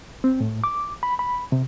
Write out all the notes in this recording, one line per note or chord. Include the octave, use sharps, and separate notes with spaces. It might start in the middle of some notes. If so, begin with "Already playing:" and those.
C4
A2
D6
B5
B5
C3